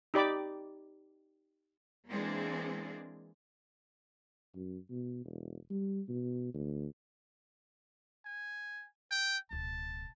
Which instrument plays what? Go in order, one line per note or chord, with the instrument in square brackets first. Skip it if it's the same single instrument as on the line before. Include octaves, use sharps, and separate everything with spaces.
[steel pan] D#4 G4 D5 B5 D6
[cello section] E3 G#3 A#3 C4 D4 G#4
[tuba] F#2
B2
E1
G3
B2
D2
[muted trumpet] G#5
G5
[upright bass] D1 B2 [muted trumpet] A5